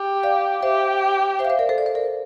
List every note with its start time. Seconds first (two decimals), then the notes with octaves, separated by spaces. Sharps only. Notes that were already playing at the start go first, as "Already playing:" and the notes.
Already playing: G4
0.23 D5 F5
0.62 G4 C5 E5
1.39 C5 E5
1.45 F5
1.50 C5 E5
1.59 A#4 D5
1.69 A4 C5
1.78 D5
1.86 C5
1.95 A#4 D5